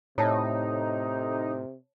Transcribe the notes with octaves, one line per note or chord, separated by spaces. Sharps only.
A2 C3 D#4 C#5 A5